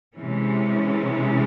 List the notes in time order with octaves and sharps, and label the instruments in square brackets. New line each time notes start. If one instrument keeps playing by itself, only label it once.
[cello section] C3 E3 G#3 C#4